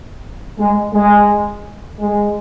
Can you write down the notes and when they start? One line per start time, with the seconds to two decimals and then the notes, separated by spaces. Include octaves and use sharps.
0.58 G#3
0.94 G#3
1.99 G#3